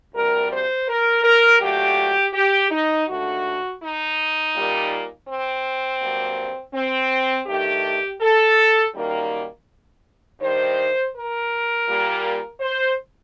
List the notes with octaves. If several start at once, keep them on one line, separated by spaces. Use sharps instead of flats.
D2 C3 G3 A#4
C5
A#4
A#4
A#2 F#3 A3 G4
G4
D#4
D#2 D3 A3 F#4
D#4
A#2 G3 A#3
C4
G2 F#3 A#3
C4
G2 D#3 A3 G4
A4
F#2 D#3 G3 A#3
G2 D#3 G3 C5
A#4
A#2 G3 A#3
C5